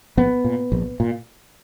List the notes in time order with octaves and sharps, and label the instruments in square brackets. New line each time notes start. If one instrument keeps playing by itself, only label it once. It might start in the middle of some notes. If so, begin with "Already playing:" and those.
[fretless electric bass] A#1 B3
A#2
A#1
A#2